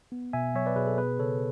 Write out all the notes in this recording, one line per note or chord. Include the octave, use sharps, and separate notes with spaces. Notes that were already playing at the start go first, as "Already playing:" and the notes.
B3
B2 E5 G#5
F#3 C#5 E5
B4 D5
B2 G#4 B4
A4
B3 G#4 B4
C#3 A4 C#5